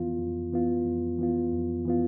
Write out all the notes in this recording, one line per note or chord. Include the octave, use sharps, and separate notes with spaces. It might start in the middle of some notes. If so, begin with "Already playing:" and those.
Already playing: F2 E3 B3 F4
F2
E3 B3 F4
F2
E3 B3 F4
F2
E3 B3 F4